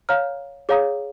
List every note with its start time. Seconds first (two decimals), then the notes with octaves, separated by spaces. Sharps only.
0.09 C#5 F5 A#5 F6
0.69 G#4 C#5 F5 A#5 D#6